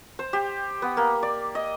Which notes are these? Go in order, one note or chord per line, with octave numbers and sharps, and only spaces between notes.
C5
G4
B3
A#3
D5
D#5